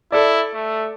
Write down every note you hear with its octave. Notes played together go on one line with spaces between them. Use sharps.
E4 A4 D5
A3